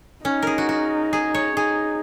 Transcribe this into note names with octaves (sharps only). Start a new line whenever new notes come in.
C#4 D#4
G#4 A#4
F#4
F#4
G#4
C#5
D#4 G#4